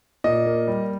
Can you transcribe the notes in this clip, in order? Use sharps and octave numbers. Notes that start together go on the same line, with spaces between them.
A#2 D#5
A#3
G3